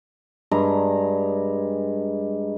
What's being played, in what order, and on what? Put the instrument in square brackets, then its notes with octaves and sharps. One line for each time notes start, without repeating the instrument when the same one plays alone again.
[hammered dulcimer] G2 G#3 A#5